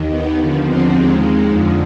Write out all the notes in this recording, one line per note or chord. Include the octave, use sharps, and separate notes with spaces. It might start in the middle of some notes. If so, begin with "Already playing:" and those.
Already playing: D#2 D#3
B3
D#2 D3 F3
C4
D#2 D#3 G#3
F2 D3 F3